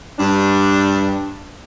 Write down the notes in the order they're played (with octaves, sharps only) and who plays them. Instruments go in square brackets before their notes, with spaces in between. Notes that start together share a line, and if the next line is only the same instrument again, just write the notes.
[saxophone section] G2 D4